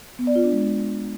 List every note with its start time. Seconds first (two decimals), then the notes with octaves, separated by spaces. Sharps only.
0.19 B3
0.27 D5
0.36 F4
0.44 D4
0.52 G#3